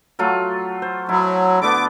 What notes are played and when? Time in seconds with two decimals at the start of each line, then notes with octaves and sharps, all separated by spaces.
0.19 F#3 A3 F4
0.82 C5
1.09 F#3 E4
1.62 D3 A3 B3 D6